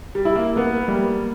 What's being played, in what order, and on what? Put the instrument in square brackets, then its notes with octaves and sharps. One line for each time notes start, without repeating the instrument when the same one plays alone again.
[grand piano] G3
[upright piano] E4
[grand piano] A#3
[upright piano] A#3 [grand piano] B3
[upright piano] G3 [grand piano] A#3